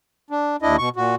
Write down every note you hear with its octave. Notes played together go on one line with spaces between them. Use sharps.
D4
D#2 D4 E4 D#5
B2 C#6
A#2 F#4